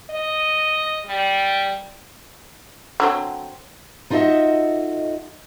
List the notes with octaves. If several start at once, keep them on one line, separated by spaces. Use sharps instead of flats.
D#5
G3
D3 F#3 C4
D#4 F4 F#4 A4 D#5 E5